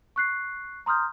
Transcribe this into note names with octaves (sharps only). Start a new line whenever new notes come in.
C#6 F#6 C7
A#5 C6 D#6 F6 G6